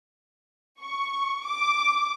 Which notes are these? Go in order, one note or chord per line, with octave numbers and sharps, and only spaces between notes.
C#6
D6